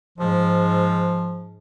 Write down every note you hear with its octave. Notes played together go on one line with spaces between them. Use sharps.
G#2 F3